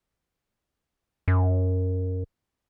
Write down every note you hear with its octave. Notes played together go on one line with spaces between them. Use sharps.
F#2